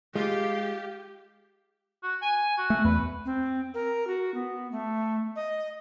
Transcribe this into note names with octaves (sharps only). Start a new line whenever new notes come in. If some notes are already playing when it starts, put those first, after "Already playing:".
G#3 F4 G4
F#4
G#5
F#4
A3
E2 B4
C4
A#4
F#4
B3
A3
D#5